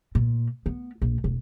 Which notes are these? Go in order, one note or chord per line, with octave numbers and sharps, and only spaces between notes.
A#2
B3
A#1
E1